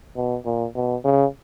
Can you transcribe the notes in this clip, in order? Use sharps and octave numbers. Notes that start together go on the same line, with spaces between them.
B2
A#2
B2
C#3